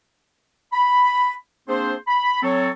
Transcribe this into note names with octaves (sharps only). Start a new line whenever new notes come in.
B5
A#3 C4 D4 G#4 C5
B5
F#3 C4 A4 C#5